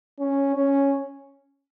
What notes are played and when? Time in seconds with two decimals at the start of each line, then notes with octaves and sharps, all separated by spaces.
0.19 C#4
0.55 C#4